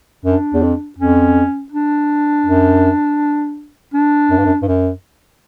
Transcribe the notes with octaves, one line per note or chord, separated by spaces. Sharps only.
F#2 D4
E2
F2
F2 C#4
D4
F#2
D4
F#2
G2
F#2
G2
F#2